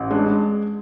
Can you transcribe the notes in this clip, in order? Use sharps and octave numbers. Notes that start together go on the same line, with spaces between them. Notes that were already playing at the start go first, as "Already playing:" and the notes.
Already playing: A1
G#3 D4